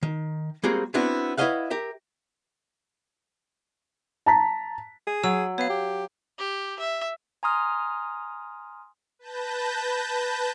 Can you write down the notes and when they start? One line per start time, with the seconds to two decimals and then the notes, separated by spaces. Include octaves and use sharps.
0.03 D#3
0.63 G3 G#3 A#3 C4 F#4 G#4
0.94 B3 C4 D4 E4 F#4
1.37 E4 B4 C#5 D#5 F5 F#5
1.70 G4 A#4 E5
4.26 A5 A#5 B6
5.07 G#4
5.24 F#3 E6
5.58 B3 C#5 F5
5.69 G4
6.38 G4
6.79 E5
7.43 G#5 A#5 C6 D#6 F6
9.19 B4 A5 G6 A#6